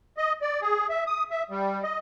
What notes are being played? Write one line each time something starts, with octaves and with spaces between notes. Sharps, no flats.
D#5
D5
G#4
E5
D#6
E5
G3
D#5